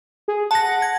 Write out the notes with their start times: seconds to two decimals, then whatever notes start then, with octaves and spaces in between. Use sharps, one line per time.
0.28 G#4
0.51 F#5 A5 A#6
0.82 G#6